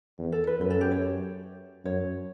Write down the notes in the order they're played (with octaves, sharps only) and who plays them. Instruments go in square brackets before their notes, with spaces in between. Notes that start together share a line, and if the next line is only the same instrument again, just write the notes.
[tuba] E2
[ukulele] A4
B4
[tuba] F#2 [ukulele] B4
[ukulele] A4
G4
C#5
[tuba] F#2 [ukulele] C#5